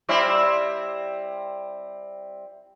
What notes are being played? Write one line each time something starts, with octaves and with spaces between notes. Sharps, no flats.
G3 C4 E4